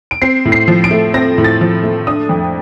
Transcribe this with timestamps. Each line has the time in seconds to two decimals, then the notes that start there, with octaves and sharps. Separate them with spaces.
0.11 D7
0.22 C4 C7
0.45 A2
0.52 C7
0.68 F3
0.84 D7
0.91 A3
1.14 C4 A#6
1.38 A2
1.44 A6
1.61 F3
1.84 A3
2.07 D4 D#6
2.29 F2